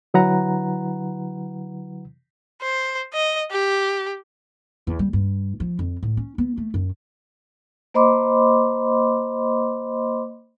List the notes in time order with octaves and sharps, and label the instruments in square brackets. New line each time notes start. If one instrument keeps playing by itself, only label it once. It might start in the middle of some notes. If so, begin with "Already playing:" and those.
[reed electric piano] D3 F#3 E4 B4 F#5 A#5
[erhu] C5
D#5
G4
[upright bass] E2
G3
G2
F3
F2
A2
C#4
B3
A3
F#2
[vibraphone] A#3 C5 D#5 B5 C6 D6